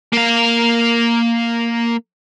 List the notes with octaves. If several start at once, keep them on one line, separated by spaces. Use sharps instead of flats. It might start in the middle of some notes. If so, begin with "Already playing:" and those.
A#3 F5